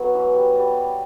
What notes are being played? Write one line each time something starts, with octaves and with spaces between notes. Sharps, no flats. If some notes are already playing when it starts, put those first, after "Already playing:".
Already playing: F#3 B3
E3
G3
G3